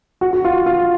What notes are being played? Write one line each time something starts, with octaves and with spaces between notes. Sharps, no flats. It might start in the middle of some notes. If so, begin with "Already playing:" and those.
F#4
F#4
F4
F4